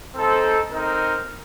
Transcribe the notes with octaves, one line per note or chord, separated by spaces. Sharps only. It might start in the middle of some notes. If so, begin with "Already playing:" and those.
C4 D#4 A4 C5
C4 D#4 A#4